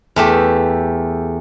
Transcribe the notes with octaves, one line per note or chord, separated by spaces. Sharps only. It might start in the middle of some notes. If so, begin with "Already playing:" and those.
E2 A3 G4